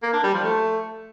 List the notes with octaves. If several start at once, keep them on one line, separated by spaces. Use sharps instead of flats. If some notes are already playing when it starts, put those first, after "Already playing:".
A#3
D4
G3
F3
A3